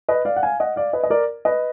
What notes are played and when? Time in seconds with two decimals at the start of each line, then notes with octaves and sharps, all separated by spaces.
0.09 B4 D#5
0.25 D5 F5
0.36 F#5
0.43 F5 G#5
0.60 D#5 F#5
0.76 D5 F5
0.93 B4 D#5
1.03 D#5
1.10 A#4 D5
1.45 B4 D#5